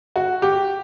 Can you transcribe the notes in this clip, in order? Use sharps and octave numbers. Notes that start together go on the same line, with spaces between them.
F#4
G4